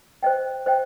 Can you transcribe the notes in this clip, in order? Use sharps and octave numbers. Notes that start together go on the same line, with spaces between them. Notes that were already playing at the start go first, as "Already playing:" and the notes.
C5 D#5 G5
C5 D#5 G5